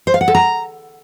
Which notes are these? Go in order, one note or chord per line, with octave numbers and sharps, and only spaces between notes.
C5
F5
F#5
A4
A#5